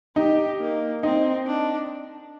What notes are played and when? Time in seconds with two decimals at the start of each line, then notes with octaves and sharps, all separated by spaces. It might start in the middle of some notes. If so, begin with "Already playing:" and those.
0.16 D#4 G4
0.60 A#3
1.03 C4 D#4
1.47 D4